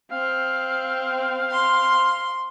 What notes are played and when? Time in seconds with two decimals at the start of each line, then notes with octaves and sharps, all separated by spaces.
0.12 C4 F5
1.51 C6